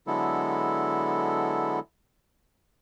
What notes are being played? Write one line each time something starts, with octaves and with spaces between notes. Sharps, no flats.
D3 F#3 G#3 B3 E4 A4